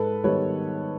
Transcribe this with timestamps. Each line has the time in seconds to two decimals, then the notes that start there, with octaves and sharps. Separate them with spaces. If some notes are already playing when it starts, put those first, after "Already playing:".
Already playing: G#2 A4 B4
0.24 D#3 G3 B3 B4 C#5